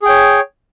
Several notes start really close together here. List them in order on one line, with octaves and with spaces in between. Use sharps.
G#4 G5 C#5